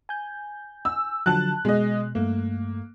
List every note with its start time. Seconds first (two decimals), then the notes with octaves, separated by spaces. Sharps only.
0.09 G#5 G6
0.85 E6
1.26 D3 F3 F#3 A5 F#6
1.65 B2 G#3 D#5
2.15 G2 A3 A#3